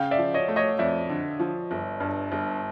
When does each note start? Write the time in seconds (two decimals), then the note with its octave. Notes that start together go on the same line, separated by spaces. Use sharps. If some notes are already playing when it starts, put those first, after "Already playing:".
Already playing: C#3 F5 G5
0.11 D5 E5
0.18 F3
0.34 C#5 D#5
0.48 A3
0.56 C#5 D#5
0.79 F2 D5 E5
1.09 D3
1.39 F3
1.71 G1
2.00 G2
2.32 G1